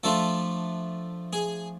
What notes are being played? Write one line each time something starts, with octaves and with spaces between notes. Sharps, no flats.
F3 A3 D4 F4 A4
G#4